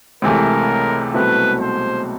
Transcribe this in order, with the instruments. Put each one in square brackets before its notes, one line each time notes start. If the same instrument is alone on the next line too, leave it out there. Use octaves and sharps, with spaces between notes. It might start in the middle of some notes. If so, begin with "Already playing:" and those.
[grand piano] C#2 C3 E3 A3 [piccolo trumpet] A#4
[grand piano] C2 B2 F#3 A3 C4 [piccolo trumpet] B4
[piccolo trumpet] C5